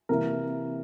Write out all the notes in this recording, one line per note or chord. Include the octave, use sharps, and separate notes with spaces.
C3 E3 A#3 A#4